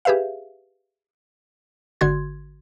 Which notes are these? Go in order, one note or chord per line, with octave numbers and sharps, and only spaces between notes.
G4 G#4 B4 E5 F5
G#1 D3 F#4 C6 G#6